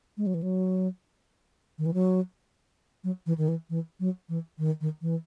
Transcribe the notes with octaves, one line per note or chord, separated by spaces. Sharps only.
G#3
F#3
E3
F#3
D#3
E3
F#3
F#3
E3
D#3
E3
E3
F#3
E3
D#3
D#3
E3